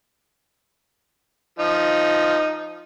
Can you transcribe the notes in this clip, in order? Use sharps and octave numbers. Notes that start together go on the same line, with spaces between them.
F3 D#4